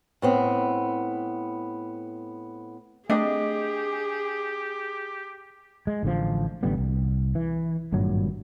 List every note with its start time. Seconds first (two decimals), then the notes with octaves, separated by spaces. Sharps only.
0.22 A2 B3 C4
3.10 A3 C4 D4 G4 G#4 D#5
5.87 G#3
6.03 A1 D3 F3
6.63 A1 D3 G3 B3
6.77 C2
7.35 E3
7.92 G#1 G2 A#2 F#3